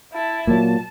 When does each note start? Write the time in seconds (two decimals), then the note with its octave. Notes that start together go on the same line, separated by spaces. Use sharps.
0.13 E4 A5
0.47 A#2 F#3 A5